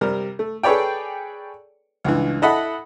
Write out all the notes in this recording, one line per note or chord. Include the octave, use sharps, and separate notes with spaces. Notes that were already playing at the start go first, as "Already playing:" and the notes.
C3 G3 A#4
A3
G#4 A4 B4 C#5 D5 G5
C#2 G2 E3
E4 A4 D#5 F#5 A5 B5